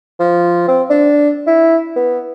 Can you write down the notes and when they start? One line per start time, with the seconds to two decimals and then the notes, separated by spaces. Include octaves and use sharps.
0.19 F3
0.68 C4
0.90 D4
1.47 E4
1.96 B3